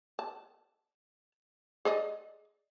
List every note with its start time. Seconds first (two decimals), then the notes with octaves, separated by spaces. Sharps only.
0.19 A5
1.85 G#4 D5 D#5